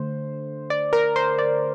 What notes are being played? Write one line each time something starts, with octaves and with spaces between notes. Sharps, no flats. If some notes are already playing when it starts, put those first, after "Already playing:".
Already playing: D3 A3 C5
D5
A#4
C5
D5